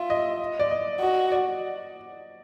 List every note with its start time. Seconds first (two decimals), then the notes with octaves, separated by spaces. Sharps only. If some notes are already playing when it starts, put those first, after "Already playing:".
Already playing: F4 E5
0.10 D#5
0.60 D5
0.71 D#5
1.00 F#4
1.32 D5